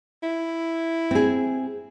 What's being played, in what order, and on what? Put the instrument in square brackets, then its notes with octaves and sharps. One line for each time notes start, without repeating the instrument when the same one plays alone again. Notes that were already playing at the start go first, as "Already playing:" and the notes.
[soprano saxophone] E4
[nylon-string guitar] C4 G#4